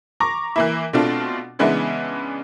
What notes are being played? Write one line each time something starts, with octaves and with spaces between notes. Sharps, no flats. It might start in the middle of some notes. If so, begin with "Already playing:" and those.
A#5 C#6 D6 A#6
E3 A#3 E4
B2 A3 C4 D4 F4
C#3 E3 G#3 B3 D4 E4